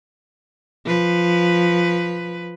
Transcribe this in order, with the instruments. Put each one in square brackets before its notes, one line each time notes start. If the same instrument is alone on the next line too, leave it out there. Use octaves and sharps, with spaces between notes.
[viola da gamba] F3 B4